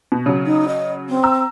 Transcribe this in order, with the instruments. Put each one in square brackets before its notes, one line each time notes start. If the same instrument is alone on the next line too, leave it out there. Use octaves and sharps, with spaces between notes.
[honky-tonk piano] B2
C#3 F#3
[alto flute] D#4
D#5
C4
[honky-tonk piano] A#5 E6